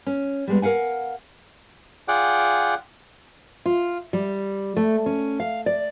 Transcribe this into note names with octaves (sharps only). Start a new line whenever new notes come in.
C#4
G3 G#3 B3
A#4 F5 F#5 G#5
F4 G#4 D5 F#5 G5
F4
G3
A3
C#4
F5
D5